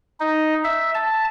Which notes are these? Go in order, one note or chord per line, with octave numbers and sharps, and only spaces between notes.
D#4
E5
A5